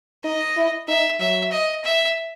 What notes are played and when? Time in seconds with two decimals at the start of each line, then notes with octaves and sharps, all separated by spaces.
0.24 D#4 D#5
0.57 E4
0.88 D#4 E5
1.20 F#3 E5
1.52 D#5
1.84 E5